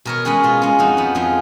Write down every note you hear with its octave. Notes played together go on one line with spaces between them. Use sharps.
B2 A#4 C#5
G#3 C#4 G#4 B4
B2 F4
G#3 C#4
F2 D#4 F#4
F3 B3
F2 F4 G#4